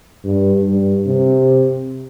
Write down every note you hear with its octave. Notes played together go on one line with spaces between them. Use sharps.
G2
G2
C3